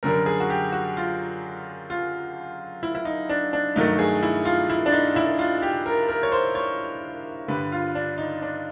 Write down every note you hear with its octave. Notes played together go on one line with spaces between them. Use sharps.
F#2 D3 G3 A#4
G#4
F#4
G4
F#4
F4
F4
E4
E4
D#4
D4
D4
G2 D#3 F#3 A3 D#4
G#4
E4
F4
E4
D4
D#4
E4
F4
G4
A#4
A#4
C#5
C5
C#5
G2 D3 G3 B4
F4
D4
D#4
D4